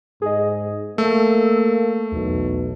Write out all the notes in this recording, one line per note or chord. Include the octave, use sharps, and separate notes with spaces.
G#2 G#4 D#5
A3 A#3 E6
B1 E2